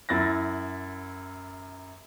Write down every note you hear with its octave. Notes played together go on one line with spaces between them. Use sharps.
F#2 E4 A6 A#6